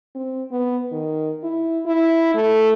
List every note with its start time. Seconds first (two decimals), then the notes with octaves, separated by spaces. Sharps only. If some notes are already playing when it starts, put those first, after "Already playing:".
0.15 C4
0.51 B3
0.92 D#3
1.43 E4
1.86 E4
2.35 A3